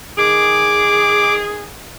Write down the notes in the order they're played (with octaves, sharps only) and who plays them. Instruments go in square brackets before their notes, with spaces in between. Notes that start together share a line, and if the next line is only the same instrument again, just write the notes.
[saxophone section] D#3 G#4 [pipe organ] D6